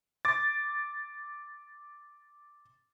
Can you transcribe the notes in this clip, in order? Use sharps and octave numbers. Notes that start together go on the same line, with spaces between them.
D6 A6